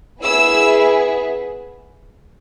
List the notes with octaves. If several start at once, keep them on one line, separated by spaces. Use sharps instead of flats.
B3 E4 G#4 E6